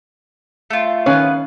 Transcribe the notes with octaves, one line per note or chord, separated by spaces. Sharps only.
A3 F4
D#3 B3 C#4 B4 C#5 F5